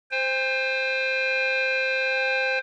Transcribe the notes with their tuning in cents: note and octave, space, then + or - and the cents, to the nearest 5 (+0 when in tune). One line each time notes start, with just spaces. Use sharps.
C5 +0 G5 +45